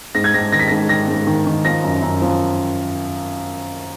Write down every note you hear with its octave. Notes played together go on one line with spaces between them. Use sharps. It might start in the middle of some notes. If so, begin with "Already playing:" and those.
G#2 A#6
G#6
G#2 A#6
D#3 A#6
B6
G#2 A#6
D#3 A#6
G#2
D#3
D#3
F3 A#6
F#2
F#2
F3